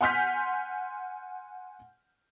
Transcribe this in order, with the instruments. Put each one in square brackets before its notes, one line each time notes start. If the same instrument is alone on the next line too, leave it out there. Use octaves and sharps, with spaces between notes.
[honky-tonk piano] F#5 G#5 C6 F6 G6 B6